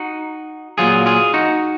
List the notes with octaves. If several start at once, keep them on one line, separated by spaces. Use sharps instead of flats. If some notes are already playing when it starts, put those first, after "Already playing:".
Already playing: D#4 F#4
A#2 F#3 F4 G#4
F4 G#4
D#4 F#4